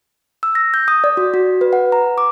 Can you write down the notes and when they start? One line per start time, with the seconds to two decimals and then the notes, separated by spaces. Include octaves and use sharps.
0.43 E6
0.55 A#6
0.74 G6
0.88 D#6
1.04 D5
1.17 F#4
1.34 F#4
1.61 B4
1.73 F#5
1.92 A#5
2.18 D6